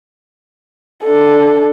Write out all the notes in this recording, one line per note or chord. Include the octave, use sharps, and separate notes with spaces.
D4 A4